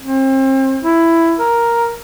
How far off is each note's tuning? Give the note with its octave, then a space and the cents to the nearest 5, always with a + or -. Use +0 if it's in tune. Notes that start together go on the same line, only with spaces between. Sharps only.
C4 +35
E4 +10
A#4 +5